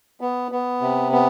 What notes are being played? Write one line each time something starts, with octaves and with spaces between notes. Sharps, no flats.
B3
B3
C3
B3